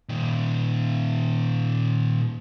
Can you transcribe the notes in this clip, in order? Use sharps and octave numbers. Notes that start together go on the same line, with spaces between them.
A#2 D#3